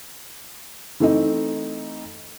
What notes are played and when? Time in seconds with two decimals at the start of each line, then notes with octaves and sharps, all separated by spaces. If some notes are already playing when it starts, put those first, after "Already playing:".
1.00 E3 A3 C4 D#4